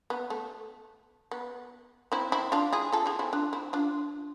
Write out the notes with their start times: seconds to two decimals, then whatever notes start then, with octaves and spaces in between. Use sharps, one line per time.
0.10 B3
0.30 A3
1.31 B3
2.12 C4 E4
2.32 C4 E4
2.52 D4 F4
2.73 E4 G#4
2.92 F4 A4
3.06 E4 G#4
3.19 C4 E4
3.33 D4 F4
3.53 C4 E4
3.73 D4 F4